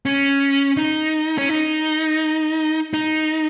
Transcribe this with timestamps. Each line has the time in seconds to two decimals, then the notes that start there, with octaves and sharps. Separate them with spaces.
0.06 C#4
0.77 D#4
1.38 C#4
1.49 D#4
2.94 D#4